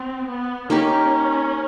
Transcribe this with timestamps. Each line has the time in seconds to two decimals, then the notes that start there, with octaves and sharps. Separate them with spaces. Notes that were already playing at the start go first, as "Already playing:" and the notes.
Already playing: C4
0.29 B3
0.70 A#3 C#4 D#4 G4